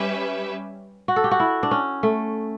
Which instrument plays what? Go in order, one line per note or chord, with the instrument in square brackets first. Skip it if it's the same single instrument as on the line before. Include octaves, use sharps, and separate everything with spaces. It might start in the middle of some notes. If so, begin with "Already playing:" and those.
Already playing: [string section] G3 C#4 G4 B4 E5
[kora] F#4
A4
G4
F#4
E4
D4
C#4
A3